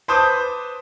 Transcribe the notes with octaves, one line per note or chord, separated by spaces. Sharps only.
B4 C5 A5 D6 D#6 G6